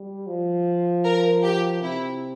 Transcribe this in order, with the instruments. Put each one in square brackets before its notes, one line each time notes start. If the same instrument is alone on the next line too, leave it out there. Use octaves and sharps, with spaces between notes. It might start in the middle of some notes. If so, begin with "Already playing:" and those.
Already playing: [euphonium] G3
F3
[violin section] A#4
G4
[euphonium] C3 [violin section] E4